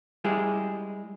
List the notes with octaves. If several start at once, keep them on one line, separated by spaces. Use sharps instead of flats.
G3 G#3 E4 G#4